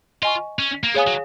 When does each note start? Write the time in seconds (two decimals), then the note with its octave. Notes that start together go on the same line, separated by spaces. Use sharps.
0.23 F4 D#5 G#5 C#6
0.59 C#4
0.84 A#3
0.94 B3 G#4 C#5 F5 G#5 D#6
1.07 F#3